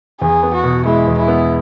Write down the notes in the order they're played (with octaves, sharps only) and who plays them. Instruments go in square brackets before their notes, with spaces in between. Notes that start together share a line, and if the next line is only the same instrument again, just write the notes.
[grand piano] E2 [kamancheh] G#4
[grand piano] B3
[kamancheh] F#4
[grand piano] B2
[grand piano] G#3 [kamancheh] E4
[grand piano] E2
[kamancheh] E4
[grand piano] B3